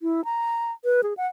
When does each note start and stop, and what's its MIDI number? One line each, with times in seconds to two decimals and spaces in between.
0.01 0.24 64
0.25 0.72 82
0.84 1.01 71
1.03 1.14 68
1.17 1.27 78